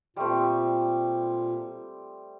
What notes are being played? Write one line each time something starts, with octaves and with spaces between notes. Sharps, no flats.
A#2 G3 A3 C4